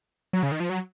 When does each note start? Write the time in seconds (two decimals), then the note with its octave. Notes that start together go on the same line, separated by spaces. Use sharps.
0.33 F#3
0.43 C#3
0.52 D#3
0.60 F3
0.69 F#3